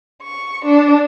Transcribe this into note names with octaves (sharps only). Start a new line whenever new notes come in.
C#6
D4